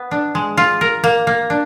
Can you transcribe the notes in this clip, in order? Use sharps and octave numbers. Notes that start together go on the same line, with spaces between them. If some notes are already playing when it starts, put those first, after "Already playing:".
Already playing: B3
D4
G#3
F4
A#4
A#3
A#3
D4